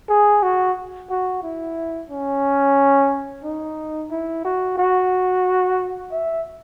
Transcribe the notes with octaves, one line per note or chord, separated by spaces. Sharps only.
G#4
F#4
F#4
E4
C#4
D#4
E4
F#4
F#4
E5